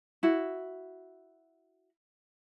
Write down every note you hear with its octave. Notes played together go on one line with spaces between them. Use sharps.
E4 F#4